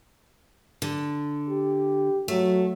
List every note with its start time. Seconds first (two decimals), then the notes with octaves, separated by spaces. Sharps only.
0.82 D3
1.49 G4
2.28 F#3 A3